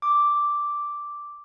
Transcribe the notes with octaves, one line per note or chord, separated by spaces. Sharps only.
D6